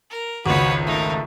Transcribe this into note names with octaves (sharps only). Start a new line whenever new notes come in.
A#4
G#1 C#2 F#4 B4 C#5
A3 D#4 A#4